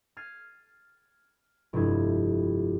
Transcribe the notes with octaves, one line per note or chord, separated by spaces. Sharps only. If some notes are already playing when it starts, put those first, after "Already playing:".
F6 G#6 A6 C7 D#7
F1 G2 G#3 E4 G#6